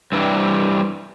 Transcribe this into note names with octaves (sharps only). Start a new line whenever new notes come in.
G2 E3 G3